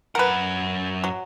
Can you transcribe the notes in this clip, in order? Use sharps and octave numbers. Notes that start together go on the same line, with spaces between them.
F#2 A#4 B4 F#5
F#3